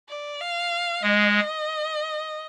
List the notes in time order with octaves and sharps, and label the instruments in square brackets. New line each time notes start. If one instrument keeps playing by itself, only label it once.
[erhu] D5
F5
[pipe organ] G#3 [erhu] D#5